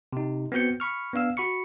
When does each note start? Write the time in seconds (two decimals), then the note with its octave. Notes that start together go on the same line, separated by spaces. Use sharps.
0.13 C3 D#4
0.52 B3 C4 F#4 G6 C#7
0.80 B5 C#6 F6
1.14 B3 D4 F5 E6
1.37 F#4 B5 C#6 C#7